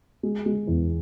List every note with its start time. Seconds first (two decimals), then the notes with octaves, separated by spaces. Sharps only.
0.23 G#3
0.46 G#3
0.67 E2